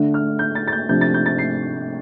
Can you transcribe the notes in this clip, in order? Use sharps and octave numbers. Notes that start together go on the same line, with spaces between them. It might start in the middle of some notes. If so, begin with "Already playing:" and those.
Already playing: D3 A3 D4
F6
G6
A6
A6
G6
C3 F3 A3 D4 G6
A6
G6
A6
C7